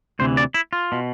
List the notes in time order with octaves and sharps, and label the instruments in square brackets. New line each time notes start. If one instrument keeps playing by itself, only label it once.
[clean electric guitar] D2 C3 E3 C5
D5
E4
F4
B2